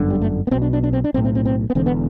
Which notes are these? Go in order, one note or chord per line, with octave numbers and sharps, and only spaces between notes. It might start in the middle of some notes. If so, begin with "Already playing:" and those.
Already playing: G1 F#2 D3
G3
A3
B3
B1 B2 C4
D4
D4
D4
C4
D4
B1 A2 C4
C4
C4
C4
B3
E1 E2 D3 C4
B3